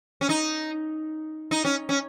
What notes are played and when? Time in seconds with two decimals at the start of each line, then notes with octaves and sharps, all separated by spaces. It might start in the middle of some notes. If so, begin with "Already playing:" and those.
0.21 C#4
0.29 D#4
1.51 D#4
1.65 C#4
1.89 C#4